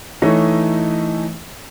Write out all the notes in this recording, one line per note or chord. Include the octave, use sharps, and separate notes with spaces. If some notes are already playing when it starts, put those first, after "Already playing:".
E3 A3 D#4 C#5 D#5